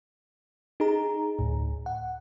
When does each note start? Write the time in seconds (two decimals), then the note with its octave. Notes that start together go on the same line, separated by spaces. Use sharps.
0.80 D#4 G#4 A#5
1.39 D2 A2
1.86 F#5